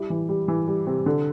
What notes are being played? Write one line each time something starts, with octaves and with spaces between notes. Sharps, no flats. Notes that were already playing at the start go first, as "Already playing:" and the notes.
Already playing: G3 E4
E3
G3
E3
G3
C3
D3